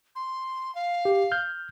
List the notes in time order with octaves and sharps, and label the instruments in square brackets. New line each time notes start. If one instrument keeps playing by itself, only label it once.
[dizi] C6
F5
[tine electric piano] G4
F6 G6